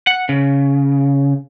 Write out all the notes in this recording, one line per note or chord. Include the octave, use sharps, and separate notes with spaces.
F#5
C#3